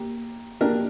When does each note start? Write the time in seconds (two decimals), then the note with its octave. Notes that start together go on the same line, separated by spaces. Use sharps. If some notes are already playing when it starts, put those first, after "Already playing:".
Already playing: A#3 G4
0.61 A#3 D4 G4 A#4